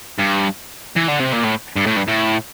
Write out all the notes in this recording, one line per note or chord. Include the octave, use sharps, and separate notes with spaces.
G2
E3
D3
C3
A#2
A2
G2
A2
G2
A2